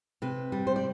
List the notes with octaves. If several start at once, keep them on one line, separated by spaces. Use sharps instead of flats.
C3 B4
G3
C5
D5